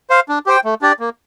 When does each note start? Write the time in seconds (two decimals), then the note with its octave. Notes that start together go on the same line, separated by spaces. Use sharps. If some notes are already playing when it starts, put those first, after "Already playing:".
0.10 C5 F5
0.29 D4
0.46 G4 C5 G5
0.64 A3
0.82 D4 G4 D5
0.99 A#3